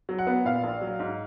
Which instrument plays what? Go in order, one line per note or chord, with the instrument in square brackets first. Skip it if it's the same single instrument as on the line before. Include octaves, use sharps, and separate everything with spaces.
[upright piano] F#3
F#5
B3
A#2 F5
A#1
F#3
G#2